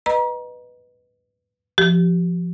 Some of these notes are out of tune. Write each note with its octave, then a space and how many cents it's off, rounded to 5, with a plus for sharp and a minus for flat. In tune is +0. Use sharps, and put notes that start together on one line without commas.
B4 +0 D#5 -15 A#5 +30
F3 +0 G4 -25